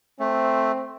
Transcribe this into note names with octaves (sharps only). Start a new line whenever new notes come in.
A3 C4